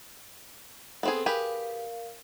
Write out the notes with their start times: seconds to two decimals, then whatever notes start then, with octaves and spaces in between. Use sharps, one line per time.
1.03 B3 C4 G#4 A4
1.26 G4 G#4 A#4 B4 F5